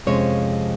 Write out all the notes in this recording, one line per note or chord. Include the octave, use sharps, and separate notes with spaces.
F2 C3 F3 G#3 C#4 C#5